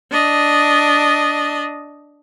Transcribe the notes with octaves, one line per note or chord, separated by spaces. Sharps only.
D4 D#5